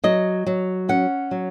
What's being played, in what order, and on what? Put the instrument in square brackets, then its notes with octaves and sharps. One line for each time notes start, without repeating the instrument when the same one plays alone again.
[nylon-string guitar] F#3 D#5
F#3
C#4 F#5
F#3